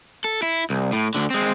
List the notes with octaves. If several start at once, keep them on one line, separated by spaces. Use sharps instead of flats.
A4
E4
C2
A2
D2 D3
G#3 C4